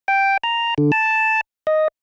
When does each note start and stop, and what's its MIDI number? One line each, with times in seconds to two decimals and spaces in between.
0.08 0.37 79
0.44 0.74 82
0.78 0.91 50
0.92 1.41 81
1.67 1.88 75